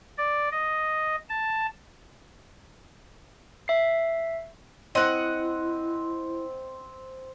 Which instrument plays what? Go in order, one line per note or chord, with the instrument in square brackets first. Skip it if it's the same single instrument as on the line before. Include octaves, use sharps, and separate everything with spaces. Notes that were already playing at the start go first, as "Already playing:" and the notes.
[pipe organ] D5
D#5
A5
[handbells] E5 C7
[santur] C4 [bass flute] E4 [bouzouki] D#5 F#5